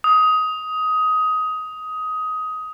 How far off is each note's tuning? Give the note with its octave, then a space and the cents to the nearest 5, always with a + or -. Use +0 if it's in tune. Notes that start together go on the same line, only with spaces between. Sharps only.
D#6 +15